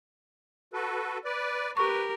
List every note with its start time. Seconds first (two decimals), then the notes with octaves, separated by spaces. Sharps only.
0.73 F#4 A4 B4
1.25 B4 D5
1.77 G4 A#4 B4 C#6